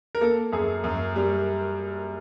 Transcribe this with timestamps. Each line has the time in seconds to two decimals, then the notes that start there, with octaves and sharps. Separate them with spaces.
0.15 A#4
0.21 A#3 A4
0.52 F#2 G#4
0.84 F#2
1.16 G3